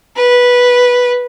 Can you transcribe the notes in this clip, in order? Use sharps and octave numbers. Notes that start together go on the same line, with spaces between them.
B4